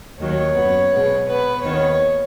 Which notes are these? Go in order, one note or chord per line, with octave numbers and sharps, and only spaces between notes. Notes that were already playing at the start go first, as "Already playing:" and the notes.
D#2 D#3 F#3 C#5
F#2 F#3 B3
B2 G#3 B3
B2 B3 B4
D#2 D#3 B3 C#5